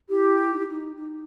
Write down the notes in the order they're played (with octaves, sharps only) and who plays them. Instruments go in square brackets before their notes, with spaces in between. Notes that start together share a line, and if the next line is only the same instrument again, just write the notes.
[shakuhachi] E4 [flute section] G4
[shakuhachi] D#4
E4
D#4
D#4